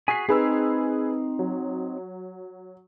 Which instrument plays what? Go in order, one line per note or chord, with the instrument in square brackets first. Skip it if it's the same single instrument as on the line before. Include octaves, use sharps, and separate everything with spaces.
[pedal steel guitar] F#4 G#4 G#5 [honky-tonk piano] B6 C7
[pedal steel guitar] C4 D#4 [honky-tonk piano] G#4 B4 E6
[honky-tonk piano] F#3